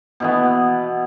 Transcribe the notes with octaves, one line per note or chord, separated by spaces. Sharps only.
B2 E3 B3